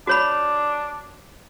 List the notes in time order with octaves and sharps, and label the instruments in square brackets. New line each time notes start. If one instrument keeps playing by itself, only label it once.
[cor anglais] D4 [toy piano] F#4 C#5 B5